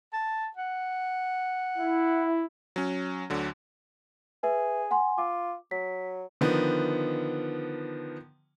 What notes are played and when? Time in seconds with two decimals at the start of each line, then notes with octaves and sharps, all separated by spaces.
0.13 A5
0.57 F#5
1.78 E4
2.76 F#3 C#4
3.30 D2 D3 F#3
4.43 G#4 B4 E5
4.91 F#5 G#5 C6
5.18 F4 D6
5.71 F#3 B6
6.41 D3 D#3 F3 B3